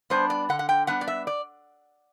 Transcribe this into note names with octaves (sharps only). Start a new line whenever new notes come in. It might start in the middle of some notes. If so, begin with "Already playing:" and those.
G3 B3 D4 C5
D5
D3 F#5
F#5
G5
G3 B3 D4 F#5
D5
E5
D5